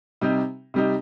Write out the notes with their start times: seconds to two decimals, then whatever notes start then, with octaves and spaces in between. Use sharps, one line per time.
0.21 C3 G3 D#4
0.74 C3 G3 D#4